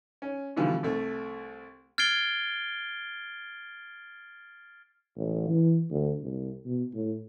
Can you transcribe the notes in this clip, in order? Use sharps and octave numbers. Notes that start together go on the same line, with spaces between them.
C#4
B2 D3 E3 F3 G3
C2 A3
F6 G#6 A6 C7 D7 G7
A1
E3
D2
C2
B2
A2